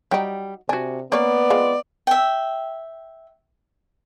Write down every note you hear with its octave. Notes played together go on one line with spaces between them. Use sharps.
F#3 G3 D#4 G5
C3 D4 F#4 G#5
A#3 B3 C#4 B4 D5
G#3 C4 F4
E5 G5